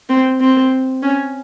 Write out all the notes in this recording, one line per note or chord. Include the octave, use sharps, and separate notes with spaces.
C4
C4
C#4